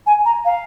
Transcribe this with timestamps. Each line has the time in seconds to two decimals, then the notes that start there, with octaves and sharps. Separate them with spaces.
0.06 G#5
0.25 A#5
0.45 F5